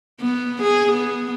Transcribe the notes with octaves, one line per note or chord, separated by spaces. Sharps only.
B3
G#4
B3